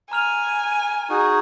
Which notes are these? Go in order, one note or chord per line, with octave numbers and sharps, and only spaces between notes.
G#5 A#5 F6 F7
D#4 F#4 G#4